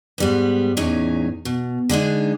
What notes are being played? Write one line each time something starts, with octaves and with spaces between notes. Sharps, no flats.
G#2 G3 B3
E2 A2 C#4 D#4
B2
D3 G#3 D4 D#4